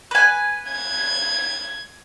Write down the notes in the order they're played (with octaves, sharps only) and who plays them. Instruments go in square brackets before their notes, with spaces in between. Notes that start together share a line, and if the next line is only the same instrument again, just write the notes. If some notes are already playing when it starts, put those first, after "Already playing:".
[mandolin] B4 G#5
[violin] G#6